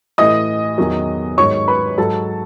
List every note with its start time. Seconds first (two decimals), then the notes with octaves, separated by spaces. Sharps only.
0.18 A2 E3 D#5 D#6
0.78 E2 D#3 F#3
1.38 G#2 D#3 F#3 C#5 C#6
1.68 B4 B5
1.98 G#2 F#3 A4 A5